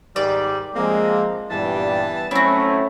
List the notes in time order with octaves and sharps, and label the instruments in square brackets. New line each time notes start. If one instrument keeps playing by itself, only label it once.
[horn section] G#2 D#3 G3 [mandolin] D5
[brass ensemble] F3 G#3 [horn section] A#3 C4
[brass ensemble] G2 A#2 G3 [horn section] E3 B3 A5
[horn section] F#3 C4 [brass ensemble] A3 C#4 [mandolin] E4 F#4